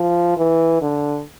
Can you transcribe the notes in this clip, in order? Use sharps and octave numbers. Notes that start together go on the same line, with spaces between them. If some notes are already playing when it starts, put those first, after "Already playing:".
Already playing: F3
E3
D3